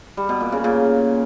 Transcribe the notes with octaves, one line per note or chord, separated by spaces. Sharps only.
G3
B2
A#2
C#3
A#2